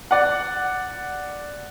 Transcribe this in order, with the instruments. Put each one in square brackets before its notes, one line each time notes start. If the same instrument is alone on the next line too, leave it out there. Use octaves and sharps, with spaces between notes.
[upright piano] D5 F#5